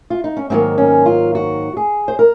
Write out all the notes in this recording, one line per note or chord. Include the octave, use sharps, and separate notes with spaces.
F4
D#4
C#4
G#2 D#3 F#3 A#3 C4
C#4
F4
F#4
G#4
C5
A#4